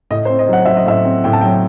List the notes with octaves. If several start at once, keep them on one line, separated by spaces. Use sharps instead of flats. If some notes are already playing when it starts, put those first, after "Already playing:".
A2 D#5
C5
C4
D#5
F#3 F#5
F#3 E5
D#5
A2 E5
C4
A2 G5
A5
F#3 G5